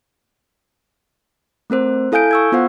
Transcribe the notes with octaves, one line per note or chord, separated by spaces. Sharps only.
A3 C4 A#4 C5
E4 A4 F5 G#5 G6 D7
C#6 E6 G#6
B3 F4 C5 F5 F#5